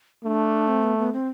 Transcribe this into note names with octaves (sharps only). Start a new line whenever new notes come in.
A3 D4
C4
B3
B3
C4